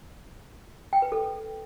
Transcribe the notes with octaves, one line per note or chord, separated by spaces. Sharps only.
G5
B4
A4